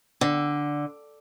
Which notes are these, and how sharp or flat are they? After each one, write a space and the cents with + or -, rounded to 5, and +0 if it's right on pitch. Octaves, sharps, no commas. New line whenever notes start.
D3 +0